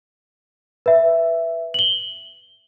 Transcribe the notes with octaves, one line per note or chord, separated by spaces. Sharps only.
B4 E5
F#7 G7